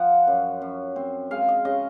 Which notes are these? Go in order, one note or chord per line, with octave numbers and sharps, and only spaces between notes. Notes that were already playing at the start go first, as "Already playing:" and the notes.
Already playing: F3 F#5
F#2
F#2
C4
G#3 F5
D#5
C#3 D#5